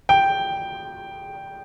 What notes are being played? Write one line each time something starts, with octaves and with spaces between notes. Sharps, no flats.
G5